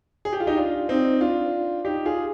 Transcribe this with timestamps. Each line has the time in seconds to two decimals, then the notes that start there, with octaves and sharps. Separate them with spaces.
0.25 G#4
0.33 G4
0.40 F4
0.47 D#4 G4
0.57 D4 F4
0.89 C4 D#4
1.21 D4 F4
1.85 D#4 G4
2.05 F4 G#4